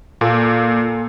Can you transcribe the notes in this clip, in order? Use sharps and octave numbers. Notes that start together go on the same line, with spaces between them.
A#2 A#3 A4